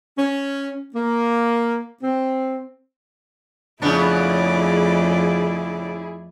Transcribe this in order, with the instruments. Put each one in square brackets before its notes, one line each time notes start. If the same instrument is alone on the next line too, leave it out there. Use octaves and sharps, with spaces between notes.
[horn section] C#4
A#3
C4
[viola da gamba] F2 A3 D5 [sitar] C#3 B3 D4 [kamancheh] E4 G#4